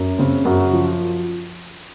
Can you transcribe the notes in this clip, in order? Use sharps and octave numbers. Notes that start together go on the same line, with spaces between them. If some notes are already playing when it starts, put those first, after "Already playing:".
Already playing: F#2
C#3 C4
F#2 F#4
F3